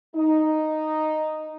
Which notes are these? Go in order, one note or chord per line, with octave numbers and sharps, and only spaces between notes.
D#4